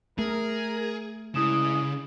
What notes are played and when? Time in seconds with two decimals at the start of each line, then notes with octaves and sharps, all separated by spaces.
0.19 A3 G#4 A#4
1.35 G2 C#3 G#3 E4 D#6 E7